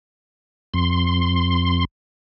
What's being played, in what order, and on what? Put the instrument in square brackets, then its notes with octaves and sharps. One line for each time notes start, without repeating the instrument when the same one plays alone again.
[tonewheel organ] F2 C6